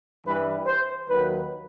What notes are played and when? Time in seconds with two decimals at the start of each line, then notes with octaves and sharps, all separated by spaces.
0.24 G2 E3 G3 B4
0.66 C5
1.09 D#2 D#3 F#3 B4